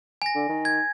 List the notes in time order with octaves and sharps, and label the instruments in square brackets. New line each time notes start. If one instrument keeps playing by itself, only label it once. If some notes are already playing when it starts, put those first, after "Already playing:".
[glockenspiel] G#5 A#6
[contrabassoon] D3
D#3
[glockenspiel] G#6